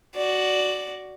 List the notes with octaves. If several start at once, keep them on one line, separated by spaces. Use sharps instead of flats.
F#4 D5